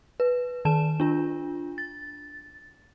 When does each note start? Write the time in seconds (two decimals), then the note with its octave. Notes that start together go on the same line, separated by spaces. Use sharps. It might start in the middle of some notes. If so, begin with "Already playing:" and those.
0.20 B4
0.65 D#3 A5 E7
1.00 D4 F4
1.78 A6